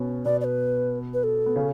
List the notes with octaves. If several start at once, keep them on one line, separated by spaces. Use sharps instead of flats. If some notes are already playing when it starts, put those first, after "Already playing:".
Already playing: B2 B3 C#4
B2 B3 D5
D5
B4
B4
A4
B3
C#3 C#4